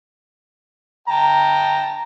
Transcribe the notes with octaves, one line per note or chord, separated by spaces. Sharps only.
G5 A5 A#5